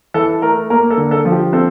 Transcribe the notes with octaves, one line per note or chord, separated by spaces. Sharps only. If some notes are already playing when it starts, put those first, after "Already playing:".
E3 A4
A3 A#4
A#3 A#4
A4
D3
A4
F3
G4
C4 A4